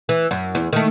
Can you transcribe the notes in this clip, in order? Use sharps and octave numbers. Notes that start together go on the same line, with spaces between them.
E3
F#2
E2
D#3 A3